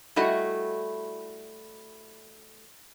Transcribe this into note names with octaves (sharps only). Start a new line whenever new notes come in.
G3 A3 E4 F#4 D#5